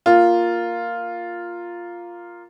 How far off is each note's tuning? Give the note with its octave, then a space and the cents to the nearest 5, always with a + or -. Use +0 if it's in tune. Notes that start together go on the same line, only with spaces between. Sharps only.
A#3 +0 F4 +0